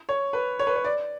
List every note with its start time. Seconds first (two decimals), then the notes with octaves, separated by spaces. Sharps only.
0.09 C#5
0.33 B4
0.59 C#5
0.67 B4
0.76 C#5
0.84 D5